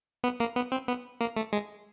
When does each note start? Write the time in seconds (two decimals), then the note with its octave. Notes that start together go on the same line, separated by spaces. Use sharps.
0.24 B3
0.40 A#3
0.56 B3
0.72 C4
0.88 B3
1.21 A#3
1.37 A3
1.53 G#3